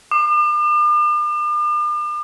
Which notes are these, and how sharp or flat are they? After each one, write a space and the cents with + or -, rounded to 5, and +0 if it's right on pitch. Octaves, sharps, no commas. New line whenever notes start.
D6 +45